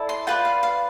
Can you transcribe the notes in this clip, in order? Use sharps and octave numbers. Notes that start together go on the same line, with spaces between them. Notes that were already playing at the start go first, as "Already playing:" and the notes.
Already playing: E4 A4 D5
C6
F4 B4 D5 G5
F5
F5